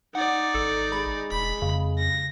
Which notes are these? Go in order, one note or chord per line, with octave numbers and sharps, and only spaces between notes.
D#4 D5 F#5
G#1 A4
G#3 B5
E1 B5 B6
F2 C#3
A#6